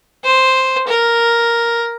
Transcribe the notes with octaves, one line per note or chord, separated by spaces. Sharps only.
C5
A#4